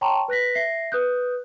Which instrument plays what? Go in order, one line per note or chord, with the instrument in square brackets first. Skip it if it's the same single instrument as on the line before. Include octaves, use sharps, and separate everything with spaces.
[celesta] C#5 G5 A5 A#5 C6 C#6
B4 F#6 A#6 B6
E5 A#6 C7
B4 D#6 F#6 G6